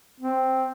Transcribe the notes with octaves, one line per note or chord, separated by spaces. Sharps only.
C4